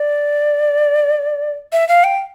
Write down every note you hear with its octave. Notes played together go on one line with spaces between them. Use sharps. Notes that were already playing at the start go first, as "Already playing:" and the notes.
Already playing: D5
E5
F5
G5